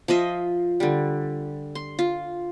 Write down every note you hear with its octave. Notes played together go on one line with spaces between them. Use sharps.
F3 F4 D#5 E5
D3 G3
C6
F4